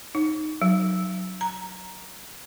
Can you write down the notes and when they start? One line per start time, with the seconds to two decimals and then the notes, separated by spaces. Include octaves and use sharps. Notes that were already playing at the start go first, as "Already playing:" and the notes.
0.15 D#4
0.62 F#3
1.41 A#5